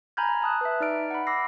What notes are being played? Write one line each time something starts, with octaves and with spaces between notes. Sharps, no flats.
G#5 A#5 B5 F6 G6 G#6
A5 D#6 F#6
B4 E5
D#4 D5 F6 D7
F#5 B5
B5 D6 E6 A#6 C7